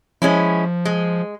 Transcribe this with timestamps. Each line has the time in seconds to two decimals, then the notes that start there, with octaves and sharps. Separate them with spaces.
0.22 F3 G#3 C#4 E4
0.85 G#3